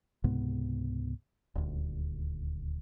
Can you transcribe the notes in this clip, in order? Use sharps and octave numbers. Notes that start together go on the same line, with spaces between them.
C#2 G#2 C3 B3
D#1 D2